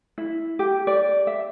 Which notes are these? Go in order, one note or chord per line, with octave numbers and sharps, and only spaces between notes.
E4
G4
D5
E5